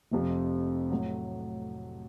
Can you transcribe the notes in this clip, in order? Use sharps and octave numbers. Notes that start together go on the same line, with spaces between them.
F1 F2 C3 F3
A2 F#3